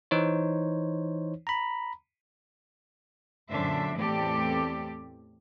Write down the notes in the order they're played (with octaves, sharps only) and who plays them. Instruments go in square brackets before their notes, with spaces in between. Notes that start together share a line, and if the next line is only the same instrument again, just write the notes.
[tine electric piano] E3 D#4 C5 C#5
A#5 B5
[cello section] F#2 A#2 D3 D4 C5 E5
E2 A2 C4 G4 A4 D5